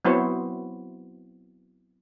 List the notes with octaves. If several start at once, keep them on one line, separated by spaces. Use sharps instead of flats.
F#3 B3 C4 E4 C5 C#5